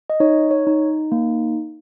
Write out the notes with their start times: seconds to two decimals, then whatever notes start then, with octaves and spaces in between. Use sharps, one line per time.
0.10 D#5
0.20 D#4 C#5
0.51 C#5
0.67 D#4
1.12 A#3